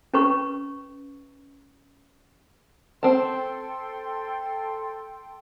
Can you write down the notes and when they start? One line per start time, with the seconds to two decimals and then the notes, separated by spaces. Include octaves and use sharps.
0.14 C#4 B4 C#6
3.03 C4 A4 G5 A5 C6